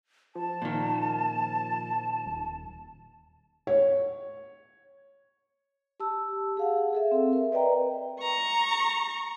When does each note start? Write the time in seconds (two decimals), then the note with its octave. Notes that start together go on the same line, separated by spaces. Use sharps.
0.35 F3 A5
0.62 A#2 D#3
2.25 D#1
3.67 C#5
6.00 G4 A5 E6
6.57 G#4 F5 F#5
6.93 G#4 A4 E5
7.11 C4
7.33 A#4 E5
7.52 B4 D5 D#5 G5 A#5
8.21 A#5 C#6